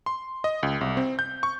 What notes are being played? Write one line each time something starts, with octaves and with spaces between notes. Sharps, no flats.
C6
D#5
C#2
C2
C4
G6
C#6